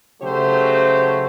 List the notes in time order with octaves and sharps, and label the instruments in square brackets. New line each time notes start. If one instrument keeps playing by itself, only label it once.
[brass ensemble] C#3 F#3 A3 G4 C5